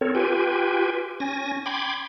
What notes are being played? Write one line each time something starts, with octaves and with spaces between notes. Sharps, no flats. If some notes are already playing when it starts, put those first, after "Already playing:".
C4 A4 A#4 C#5
F4 G4 B4 G5 G#5
C#4 G#5 A#6
G5 B5 C6 D6 G#6